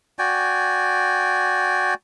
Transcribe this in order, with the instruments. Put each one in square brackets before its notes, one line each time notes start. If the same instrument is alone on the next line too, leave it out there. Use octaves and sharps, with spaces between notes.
[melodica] F#4 D5 G5 G#5